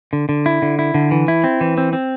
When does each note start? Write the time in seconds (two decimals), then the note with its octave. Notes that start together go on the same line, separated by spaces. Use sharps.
0.13 D3
0.29 D3
0.46 E4
0.62 D3
0.79 E4
0.94 D3
1.11 E3
1.28 E4
1.44 C4
1.61 E3
1.78 C4
1.93 C4